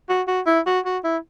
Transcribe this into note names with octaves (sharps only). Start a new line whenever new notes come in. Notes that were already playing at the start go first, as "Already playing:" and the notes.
F#4
F#4
E4
F#4
F#4
E4